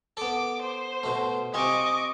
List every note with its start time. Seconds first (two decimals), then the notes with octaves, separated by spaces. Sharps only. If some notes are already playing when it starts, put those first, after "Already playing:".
0.17 B3 A4 D6
0.62 C5
1.03 B2 A3
1.54 C3 F4 D#5 G#5 C#6 D6